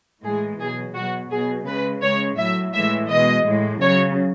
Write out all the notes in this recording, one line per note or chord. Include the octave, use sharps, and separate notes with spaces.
A2 E3 G#3 G#4
B2 F#3 G#4
B2 F#3 F#4
B2 F#3 G#4
C#3 G#3 B4
C#3 G#3 C#5
A2 F#3 E5
A2 E3 G#3 E5
B2 G#3 D#5
A2 G#3
C#3 F#3 C#5